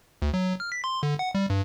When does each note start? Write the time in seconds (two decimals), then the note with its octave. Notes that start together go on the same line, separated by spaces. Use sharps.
0.22 D2
0.34 F#3
0.60 F6
0.72 B6
0.84 C6
1.03 D3
1.19 F#5
1.35 G3
1.50 G2